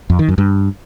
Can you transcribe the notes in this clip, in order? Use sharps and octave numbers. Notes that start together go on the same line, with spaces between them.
F2
D#3
F#2
G2